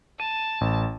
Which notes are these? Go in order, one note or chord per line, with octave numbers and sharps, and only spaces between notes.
A5 D#7
A1